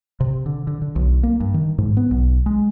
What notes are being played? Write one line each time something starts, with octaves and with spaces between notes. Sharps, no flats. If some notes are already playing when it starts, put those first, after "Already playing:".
C3
D3
D3
D3
B1
A#3
G2
D#3
G#2
B3
B1
G#3